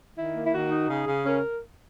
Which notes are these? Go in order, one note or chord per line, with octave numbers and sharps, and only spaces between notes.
D#3 E4
A#3
E4
D#3 F#4
D#4
C#3 G#4
C#3
C#4 A#4